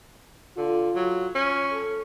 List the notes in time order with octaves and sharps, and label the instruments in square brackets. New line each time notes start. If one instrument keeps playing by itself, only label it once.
[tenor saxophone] D3 [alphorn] F4
[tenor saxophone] F#3
C#4
[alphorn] A4